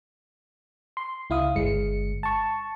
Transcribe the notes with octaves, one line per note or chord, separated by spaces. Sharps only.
C6
C#2 E4 F5 D#6
G1 G#3 C#7
A5 C#6